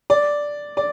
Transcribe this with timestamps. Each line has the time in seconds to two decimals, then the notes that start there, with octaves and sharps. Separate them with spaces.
0.10 D5
0.77 D5